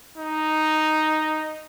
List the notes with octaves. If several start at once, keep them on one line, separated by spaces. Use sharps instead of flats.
D#4